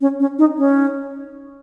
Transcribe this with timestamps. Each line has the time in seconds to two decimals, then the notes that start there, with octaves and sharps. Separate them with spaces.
0.01 C#4
0.20 C#4
0.39 D#4
0.58 C#4